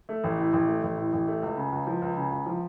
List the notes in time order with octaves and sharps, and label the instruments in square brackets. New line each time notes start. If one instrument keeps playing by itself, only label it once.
[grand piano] A3
A1
A2
A1
A3
A1
A2
A1
A3
C#2
C#3
C#2
F3
C#2
C#3
C#2
F3